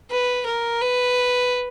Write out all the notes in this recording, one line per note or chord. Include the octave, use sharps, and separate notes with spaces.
B4
A#4
B4